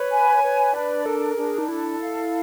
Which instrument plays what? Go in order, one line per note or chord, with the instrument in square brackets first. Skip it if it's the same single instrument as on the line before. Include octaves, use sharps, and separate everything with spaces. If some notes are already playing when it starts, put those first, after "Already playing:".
Already playing: [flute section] B4 [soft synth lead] C#5
[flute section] G#5
B4
[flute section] D4 [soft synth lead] D5
[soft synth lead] A4 [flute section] A#4
[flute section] D4 [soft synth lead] G#4
[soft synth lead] D#4
[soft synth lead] E4 [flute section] A4
[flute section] F5